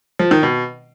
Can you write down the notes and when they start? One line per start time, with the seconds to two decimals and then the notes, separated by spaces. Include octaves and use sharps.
0.19 F3
0.31 D#3
0.43 B2